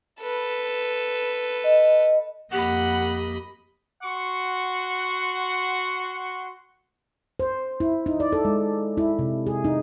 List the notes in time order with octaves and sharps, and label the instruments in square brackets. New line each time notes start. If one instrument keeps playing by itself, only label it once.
[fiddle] A4 B4
[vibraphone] D#5
[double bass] F2 A#3 [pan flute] G4 [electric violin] D#5 B5 [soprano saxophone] F#5
[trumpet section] F#4 F#5 C6 C#6
[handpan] C5
E4
D#4
D5
A4
G#3
E4
C3
G#4
D#4